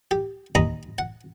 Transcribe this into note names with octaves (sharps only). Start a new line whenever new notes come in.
G4
D#2 D#5 A#5 B5 D#6
F#5